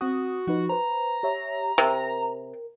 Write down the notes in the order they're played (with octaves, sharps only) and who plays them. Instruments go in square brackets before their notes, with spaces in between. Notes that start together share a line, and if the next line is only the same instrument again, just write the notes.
[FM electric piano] C4 D#6 [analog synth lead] F#4
[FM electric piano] F3 D#4 B4 [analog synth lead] F#4
[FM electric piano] B4 C5 [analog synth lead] A#5
[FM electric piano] G4 C#5 E5
[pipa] C3 [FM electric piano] A#4